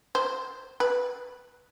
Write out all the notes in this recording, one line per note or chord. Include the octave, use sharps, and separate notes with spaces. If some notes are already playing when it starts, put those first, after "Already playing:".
C5
B4